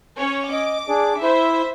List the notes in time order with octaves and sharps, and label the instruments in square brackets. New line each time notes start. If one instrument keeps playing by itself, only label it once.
[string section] C#4 C#5
[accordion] D#5 [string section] D6
[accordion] D4 G#4 D5
[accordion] E4 [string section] C5 E5